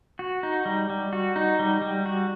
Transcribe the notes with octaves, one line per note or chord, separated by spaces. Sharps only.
F#4
D#4
G3
G3
F#4
D#4
G3
G3
F#4